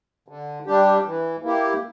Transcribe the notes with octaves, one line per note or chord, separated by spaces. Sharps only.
D3
G3 D4 G4
E3
A#3 E4 G4